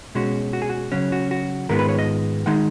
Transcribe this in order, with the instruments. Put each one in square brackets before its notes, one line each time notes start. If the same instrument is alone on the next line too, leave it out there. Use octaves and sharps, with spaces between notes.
[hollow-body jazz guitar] B2 G#3 C#4 F#4
F#4
G#4
F#4
C#3 F#3 C#4
F#4
F#4
G#2 D#3 G#3 B3 F4 A#4
B4
C#5
D#5
D#3 G#3 D#4 F#5